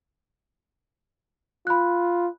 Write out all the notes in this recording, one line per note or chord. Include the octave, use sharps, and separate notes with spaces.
F4 B5 F#6